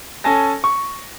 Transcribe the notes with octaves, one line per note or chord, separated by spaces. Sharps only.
C#4 A4 G#5 A5 A#6
C#6